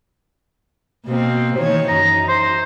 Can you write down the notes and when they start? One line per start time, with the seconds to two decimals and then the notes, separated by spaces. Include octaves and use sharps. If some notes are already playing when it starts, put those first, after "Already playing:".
1.06 B2 A#3 C4
1.57 D#3 E3 C#5
1.88 F#2 D#4 A#5
2.28 C5